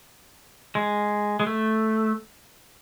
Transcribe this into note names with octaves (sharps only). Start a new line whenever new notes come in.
G#3
G#3
A3